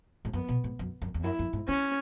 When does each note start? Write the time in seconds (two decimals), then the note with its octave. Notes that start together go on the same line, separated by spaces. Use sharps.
0.25 G#2
0.33 F#2 B3
0.49 B2
0.64 G#2
0.79 F#2
1.02 F#2
1.14 E2
1.24 F#2 E4
1.39 F#2
1.53 G#2
1.68 C#3 C#4